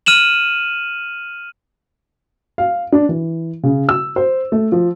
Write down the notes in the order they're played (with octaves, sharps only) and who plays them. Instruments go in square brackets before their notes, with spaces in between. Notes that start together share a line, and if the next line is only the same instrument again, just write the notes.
[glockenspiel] F6 D#7 E7 F#7
[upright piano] F5
D4
E3
C#3
E6
C5
A3
F3